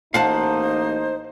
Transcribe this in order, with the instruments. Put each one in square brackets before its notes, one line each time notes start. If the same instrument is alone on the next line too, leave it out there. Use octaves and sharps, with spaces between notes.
[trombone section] A1 A#3 D#4 [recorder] C5 [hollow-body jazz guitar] F5 F#5 A5